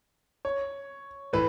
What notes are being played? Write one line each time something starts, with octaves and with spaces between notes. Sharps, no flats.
C#5
A2 E3 B4